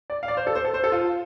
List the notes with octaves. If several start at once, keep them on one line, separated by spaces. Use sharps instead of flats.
D5
F5
D5
C5
A4
C5
A4
C5
A4
F4